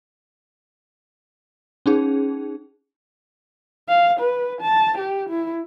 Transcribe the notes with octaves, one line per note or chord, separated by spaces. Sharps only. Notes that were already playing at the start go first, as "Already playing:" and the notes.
C#4 D#4 G#4
F5
B4
A5
G4
E4